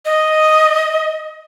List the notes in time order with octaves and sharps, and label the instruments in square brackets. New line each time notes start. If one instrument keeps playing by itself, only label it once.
[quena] D#5